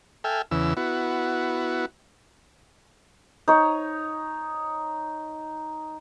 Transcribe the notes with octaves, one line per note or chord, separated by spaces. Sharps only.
A4 E5 G5 G#5 F6
E2 C#3 E3 E6
B3 E4 F#4
D#4 C#5